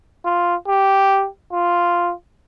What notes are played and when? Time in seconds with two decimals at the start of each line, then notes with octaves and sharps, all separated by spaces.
0.25 F4
0.68 G4
1.53 F4